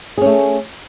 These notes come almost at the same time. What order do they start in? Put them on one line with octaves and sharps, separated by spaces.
G#4 C#4 A3